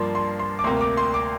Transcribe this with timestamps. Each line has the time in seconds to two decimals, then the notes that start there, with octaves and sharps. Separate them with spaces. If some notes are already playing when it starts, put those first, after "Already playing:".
Already playing: G2 F3 A#3 D4 C6
0.15 C6
0.39 C6
0.59 D6
0.64 D2 C3 A#3 C6
0.81 D6
0.97 C6
1.14 D6